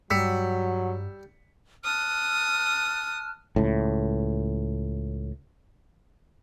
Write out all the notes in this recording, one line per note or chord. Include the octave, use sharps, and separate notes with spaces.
G2 F#3 G3 E6 B6 C#7
A5 D#6 F6 F#6
C#2 A2